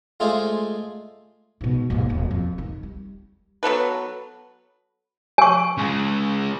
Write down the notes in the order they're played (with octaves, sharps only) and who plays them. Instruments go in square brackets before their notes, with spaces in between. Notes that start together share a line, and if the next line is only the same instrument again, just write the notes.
[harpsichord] G#3 A3 F4 G#4 C5 D5
[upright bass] G#2 B2
D#2 G#2
D#1 F4
F2
D#3
G3
[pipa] F#3 B3 A4 B4
[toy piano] G#5 C#6
[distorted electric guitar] C#3 G#3